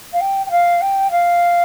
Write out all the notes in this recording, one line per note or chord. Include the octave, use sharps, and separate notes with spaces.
F5
G5
G5
F5
G5
F5